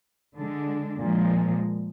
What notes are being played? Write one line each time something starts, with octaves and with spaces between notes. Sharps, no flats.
D3 G#3 D4
A#2 F3 G#3